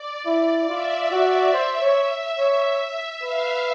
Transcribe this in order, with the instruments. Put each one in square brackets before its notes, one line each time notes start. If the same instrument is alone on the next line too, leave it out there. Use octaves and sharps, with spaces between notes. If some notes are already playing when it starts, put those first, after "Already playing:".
Already playing: [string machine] D5
[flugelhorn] E4
[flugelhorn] F4 [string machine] E5
[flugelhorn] F#4
C5
C#5
C#5
[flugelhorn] B4 [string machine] F5